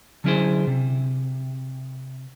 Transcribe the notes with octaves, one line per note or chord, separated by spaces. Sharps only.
D3 F#3 C#4 E4 G#4 C5
C3